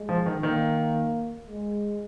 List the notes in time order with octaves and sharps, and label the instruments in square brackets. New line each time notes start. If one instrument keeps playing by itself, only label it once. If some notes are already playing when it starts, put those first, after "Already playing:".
Already playing: [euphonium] G#3
[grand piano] F3
D#3
[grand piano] D#3 [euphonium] A#3
[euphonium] G#3